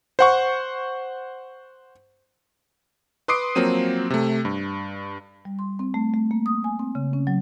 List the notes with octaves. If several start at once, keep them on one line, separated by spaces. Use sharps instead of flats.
C5 F#5 C#6
B4 C6 D6 D#6 C7 D7
F3 F#3 A#3 C4 D#7
C3 A3
G2
G3
C6
C4
A3
A3
A#3
D#6
G#5
C4
C#3
C#4
F#3